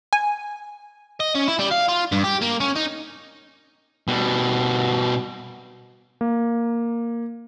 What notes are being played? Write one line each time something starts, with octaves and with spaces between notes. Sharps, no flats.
G#5
D#5
C#4
E4
G3
F5
F4
G2
G4
A#3
C#4
D#4
B2 G3
A#3